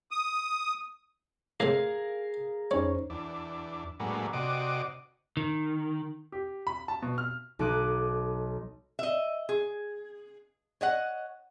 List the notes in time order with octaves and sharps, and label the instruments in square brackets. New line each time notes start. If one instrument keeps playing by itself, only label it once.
[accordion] D#6
[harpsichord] A2 C3 G#3 [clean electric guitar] G#4 A#4 F5
[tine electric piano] F2 D#4 C5 [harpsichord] G3 [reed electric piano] C#4 C#5
[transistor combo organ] E2 D4
A2 F#3 G#3 A#3 B3 D4
C3 F#4 D5 D#5 D6
[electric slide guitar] D#3
[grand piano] G4
B5
A5
B2
F6
[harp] B1 D#4 A4 D6 F#6 D#7
[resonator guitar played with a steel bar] D#5 E5
G#4
C#5 D#5 F#5